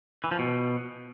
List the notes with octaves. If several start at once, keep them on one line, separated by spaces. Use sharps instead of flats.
E3
F3
B2